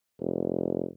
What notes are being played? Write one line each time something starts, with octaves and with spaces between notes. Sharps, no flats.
F1